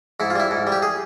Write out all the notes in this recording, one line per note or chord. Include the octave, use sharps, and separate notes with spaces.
G#2 E4
F4
G3 E4
G#2
G3
G4
G#4